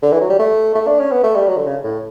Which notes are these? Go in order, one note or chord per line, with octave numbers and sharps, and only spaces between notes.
D3
E3
F#3
G3
A3
A3
D4
C#4
B3
A3
G3
F#3
D3
C#3
A2